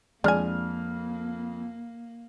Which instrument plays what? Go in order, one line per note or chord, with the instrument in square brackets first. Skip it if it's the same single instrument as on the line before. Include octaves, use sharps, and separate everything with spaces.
[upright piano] F2 F6 [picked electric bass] G#3 [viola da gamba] A#3 [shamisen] D4 G#5